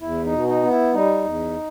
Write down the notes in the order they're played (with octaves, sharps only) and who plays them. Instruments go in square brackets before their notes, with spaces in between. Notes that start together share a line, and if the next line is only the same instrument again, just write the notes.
[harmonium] E2 E4
D#4
B2
D#4
B3
E4
G3 D#4
E2